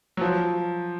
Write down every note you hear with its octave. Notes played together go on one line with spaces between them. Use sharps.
F#3
F3